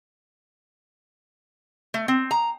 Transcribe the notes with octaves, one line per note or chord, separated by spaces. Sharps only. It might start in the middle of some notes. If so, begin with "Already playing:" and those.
A3
C4
A#5